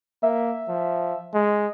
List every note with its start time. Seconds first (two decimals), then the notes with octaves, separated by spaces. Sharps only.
0.23 A#3 E5
0.68 F3
1.34 G#3